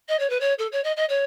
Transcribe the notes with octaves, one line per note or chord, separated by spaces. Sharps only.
D#5
C#5
B4
C#5
A4
C#5
D#5
D#5
C#5